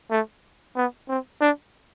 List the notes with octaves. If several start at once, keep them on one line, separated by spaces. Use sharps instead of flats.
A3
B3
C4
D4